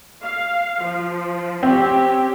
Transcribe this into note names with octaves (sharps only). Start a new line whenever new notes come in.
F5
F3
C4 C#4 G4